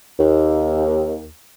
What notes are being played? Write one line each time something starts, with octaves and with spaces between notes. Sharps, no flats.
D#2